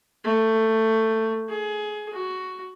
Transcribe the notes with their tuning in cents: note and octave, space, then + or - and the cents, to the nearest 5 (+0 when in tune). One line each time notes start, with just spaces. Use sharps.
A3 +15
G#4 +20
F#4 +10